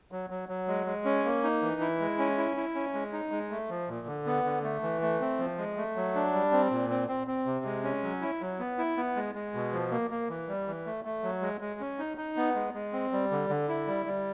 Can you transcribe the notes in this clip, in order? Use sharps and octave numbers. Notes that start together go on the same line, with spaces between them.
F#3
F#3
F#3
G#3
G#3
C#4
A#3
D#4
E3
E4
G#3
C#4
E4
E4
C#4
G#3
D#4
G#3
A3
F3
A#2
D3
B3
D3
A3
E3
A3
C4
F3
G#3
A3
F#3
D4
G3
C4
A#2
C4
C4
C4
C3
G#3
C#4
F#3
E4
F#3
B3
E4
B3
G#3
G#3
B2
F3
A#3
A#3
E3
G3
E3
A3
A3
F#3
G#3
G#3
C#4
D#4
D#4
B3
G#3
G#3
C4
G3
D3
D3
E4
G3
G3